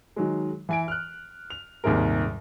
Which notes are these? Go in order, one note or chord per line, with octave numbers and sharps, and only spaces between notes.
D#3 F#3 G#3
E3 G#5 D7
F6 F#6
F7
D#1 D#2 G#2 C3 G#3 A#4